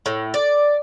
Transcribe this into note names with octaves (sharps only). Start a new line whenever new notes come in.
A2
D5